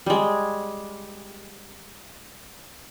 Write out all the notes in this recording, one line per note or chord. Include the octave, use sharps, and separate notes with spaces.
G3 G#3